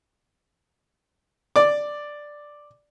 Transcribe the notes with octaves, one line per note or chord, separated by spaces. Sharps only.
D5 D6